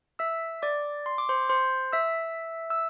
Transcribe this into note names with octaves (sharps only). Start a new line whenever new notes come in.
E5 E6
D5 D6
C6
D6
C5 C6
C5 C6
E5 E6
E6